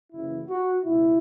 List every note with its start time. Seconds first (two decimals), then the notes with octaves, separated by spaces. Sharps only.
0.13 F#1 F#2 C#3 E3 E4
0.49 F#4
0.84 C#2 B2 E4